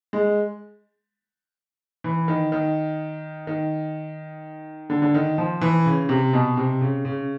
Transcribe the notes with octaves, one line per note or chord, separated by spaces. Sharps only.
G#3
E3
D#3
D#3
D#3
D3
D3
D#3
F3
E3
C#3
C3
B2
C3
C#3
C#3